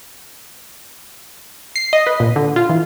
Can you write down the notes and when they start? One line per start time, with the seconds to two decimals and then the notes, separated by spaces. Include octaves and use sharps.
1.76 C7
1.93 D#5
2.07 B4
2.20 A#2
2.36 D3
2.56 F4
2.69 E3